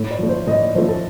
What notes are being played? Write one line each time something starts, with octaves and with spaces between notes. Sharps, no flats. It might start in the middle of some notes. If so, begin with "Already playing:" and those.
Already playing: A2
D5
F3 A3
C5
A2 D#5
D5
F3 A3 C5
A4